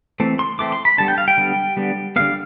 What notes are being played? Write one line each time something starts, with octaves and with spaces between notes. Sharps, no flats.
E3 A3 C4
C6
E3 A3 C4 D6
C6
B5
D3 G3 B3 A5
G5
F5
G5
D3 G3 B3
D3 G3 B3
D3 G3 B3 F5